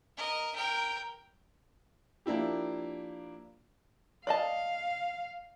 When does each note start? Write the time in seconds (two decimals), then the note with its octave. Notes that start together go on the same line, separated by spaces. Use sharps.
0.17 A#4 D#5
0.55 A#4 G5
2.26 F3 A#3 D4 E4 G4
4.27 D5 D#5 F5 A5